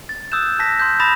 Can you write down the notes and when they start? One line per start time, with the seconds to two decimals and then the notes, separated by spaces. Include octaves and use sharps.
0.09 A6
0.32 D#6 E6 F#6 G6 E7
0.59 A5 A#6 B6
0.80 C6 D#6 G6
1.00 B5 D#6 A6 A#6 E7